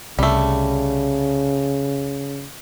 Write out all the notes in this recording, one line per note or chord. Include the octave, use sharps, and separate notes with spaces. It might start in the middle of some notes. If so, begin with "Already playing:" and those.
C2 C#3 G3 A3